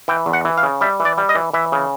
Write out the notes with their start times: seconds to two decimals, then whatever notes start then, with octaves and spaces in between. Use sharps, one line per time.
0.08 E3 G5
0.26 E2
0.33 F#5
0.45 E3
0.58 F5
0.63 C#3
0.81 G3 E5
1.00 E3
1.05 D5
1.18 G3
1.29 D#5
1.35 E3
1.54 E3 E5
1.72 C#3